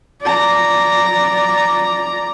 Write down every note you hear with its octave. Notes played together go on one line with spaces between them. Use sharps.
D5 A#5